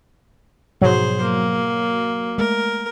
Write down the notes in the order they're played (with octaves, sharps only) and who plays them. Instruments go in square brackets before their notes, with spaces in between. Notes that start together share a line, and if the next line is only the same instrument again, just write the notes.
[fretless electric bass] G#2 B2 F3 [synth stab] F#3 [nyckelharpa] G#4 C5
[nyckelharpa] A#3
[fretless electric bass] G#3 A3 [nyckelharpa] A#4